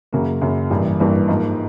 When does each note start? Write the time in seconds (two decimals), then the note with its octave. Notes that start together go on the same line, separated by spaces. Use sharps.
0.13 F#2 C#3 F#3 A#3
0.41 F#2 C#3 F#3 A#3
0.70 A1 G2 E3 G3 A#3
1.00 A1 G2 E3 G3 A#3
1.28 G#2 F3 A#3 D#4